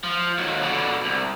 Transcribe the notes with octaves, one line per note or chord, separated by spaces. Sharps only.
F3
D#2 F#3
B2 D3
C2